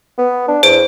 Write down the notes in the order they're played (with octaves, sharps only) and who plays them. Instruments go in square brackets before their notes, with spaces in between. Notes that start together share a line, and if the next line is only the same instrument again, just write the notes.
[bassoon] B3
D4
[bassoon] E2 [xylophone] C5 D7